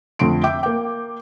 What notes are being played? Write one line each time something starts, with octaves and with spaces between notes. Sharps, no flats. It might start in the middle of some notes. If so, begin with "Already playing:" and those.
F2 D3 A3 C6 D7
E5 G5 D6
A#3 G5